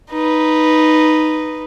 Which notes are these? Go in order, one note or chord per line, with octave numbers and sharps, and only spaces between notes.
D#4 B4